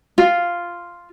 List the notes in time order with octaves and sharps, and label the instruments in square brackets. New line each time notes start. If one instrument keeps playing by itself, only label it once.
[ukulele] F4